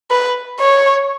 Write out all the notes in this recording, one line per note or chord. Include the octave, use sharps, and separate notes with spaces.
B4
C#5